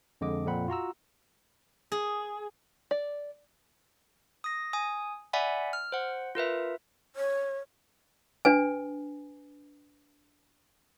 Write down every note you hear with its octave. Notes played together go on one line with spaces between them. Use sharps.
F2 D3 G#3 D#5 D6
F2 A#2 C4 F#5 B5
F4 F#4 A#5 E6
G#4
D5
D#6 A#6
G#5 D#6
D5 E5 F#5 G#5 B5
F6
C5 F#5
F4 A#4 B4 E5
C#5
D4 B4 G#5